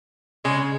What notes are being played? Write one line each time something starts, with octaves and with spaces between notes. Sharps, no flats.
C#3 G#3